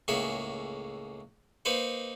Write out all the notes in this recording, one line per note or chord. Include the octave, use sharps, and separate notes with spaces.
C#2 A2 A#3 G#4 E5 F#5
A#3 D#4 B4 C5 F#5